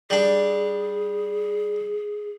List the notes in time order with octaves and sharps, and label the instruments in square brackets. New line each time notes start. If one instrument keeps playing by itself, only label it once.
[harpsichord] G3 D4 [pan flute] G#4